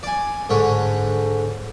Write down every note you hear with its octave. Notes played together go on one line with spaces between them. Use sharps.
D5 G#5
G#2 D3 C#5